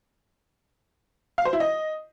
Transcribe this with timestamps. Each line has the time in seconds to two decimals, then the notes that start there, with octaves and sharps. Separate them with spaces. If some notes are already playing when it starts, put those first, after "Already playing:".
1.38 F5
1.45 C5
1.53 E4
1.60 D#5